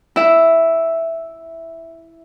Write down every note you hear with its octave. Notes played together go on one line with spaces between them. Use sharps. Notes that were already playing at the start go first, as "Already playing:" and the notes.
E4 E5